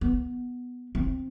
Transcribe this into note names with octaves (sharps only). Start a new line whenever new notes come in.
B3
C4